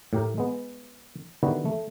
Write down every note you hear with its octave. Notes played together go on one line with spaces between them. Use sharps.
A2 G4 A#4
G#3 B3
D3 D#3 G3 B3 E4 F#4
A3